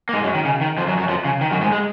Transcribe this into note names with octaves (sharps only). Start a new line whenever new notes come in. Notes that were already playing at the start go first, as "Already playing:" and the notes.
A#3
G#2 G#3
F#2 F#3
D#3
C#3
D#3
F2 F3
F#2 F#3
F#2 F#3
F2 F3
C#3
D#3
F#2 F#3
G#2 G#3
G#3